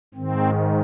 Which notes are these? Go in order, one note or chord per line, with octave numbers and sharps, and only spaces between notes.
G#2 D#3 C4